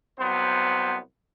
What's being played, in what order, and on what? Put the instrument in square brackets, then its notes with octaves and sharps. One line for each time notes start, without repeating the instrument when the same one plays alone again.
[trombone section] C2 F#3 B3 C5